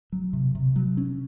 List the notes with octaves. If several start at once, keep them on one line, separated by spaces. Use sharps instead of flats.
F#3
C3
C3
F#3
C#4